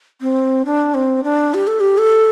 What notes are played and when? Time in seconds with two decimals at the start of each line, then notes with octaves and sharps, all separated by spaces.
0.21 C4
0.65 D4
0.94 C4
1.24 D4
1.54 G4
1.67 A4
1.80 G4
1.98 A4